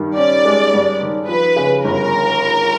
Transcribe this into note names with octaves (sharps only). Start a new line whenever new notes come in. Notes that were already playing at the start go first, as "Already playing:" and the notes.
Already playing: G2 D#3
C#4 D5
G#3
G2
D#3
F3 B4
C#3
G1 A#4